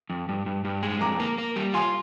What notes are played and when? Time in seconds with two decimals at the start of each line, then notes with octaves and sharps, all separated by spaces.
0.10 F2
0.29 G2
0.46 G2
0.65 G2
0.83 G#3
1.01 F2 A#5 D6
1.20 A#3
1.38 A#3
1.56 G3
1.74 F4 G#5 C6